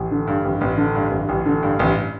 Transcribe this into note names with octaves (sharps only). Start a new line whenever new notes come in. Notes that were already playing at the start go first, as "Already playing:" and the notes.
Already playing: A1
D3
G2
A1
A1
D3
G2
A1
A1
D3
G2
A1